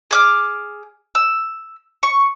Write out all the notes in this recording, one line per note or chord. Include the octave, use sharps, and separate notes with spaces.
G#4 D6 F6
E6
C#6